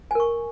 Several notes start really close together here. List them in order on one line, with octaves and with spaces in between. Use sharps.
G#5 A#4 C#6